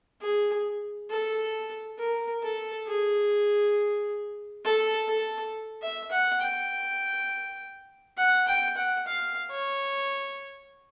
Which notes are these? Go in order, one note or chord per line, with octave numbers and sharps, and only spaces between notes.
G#4
A4
A#4
A4
G#4
A4
A4
E5
F#5
G5
F#5
G5
F#5
F5
C#5